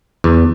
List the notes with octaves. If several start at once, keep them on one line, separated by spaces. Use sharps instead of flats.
E2